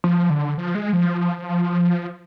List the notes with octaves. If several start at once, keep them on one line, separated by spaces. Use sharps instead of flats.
F3
D3
F3
G#3
F3